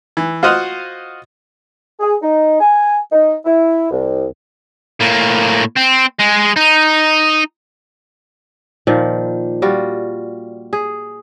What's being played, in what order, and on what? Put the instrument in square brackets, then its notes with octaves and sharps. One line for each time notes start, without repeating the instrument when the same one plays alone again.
[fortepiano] E3
F4 F#4 C5 D#5 F5 F#5
[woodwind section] G#4
D#4
G#5
D#4
E4
C2
[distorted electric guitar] A2 A#3
C4
G#3
D#4
[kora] A#2 D#3 F3
G3 F4 F#4
G#4